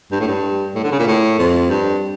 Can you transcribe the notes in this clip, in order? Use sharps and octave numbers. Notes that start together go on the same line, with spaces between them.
G2
A2
G2
A2
D3
C#3
A#2
A2
F2
G2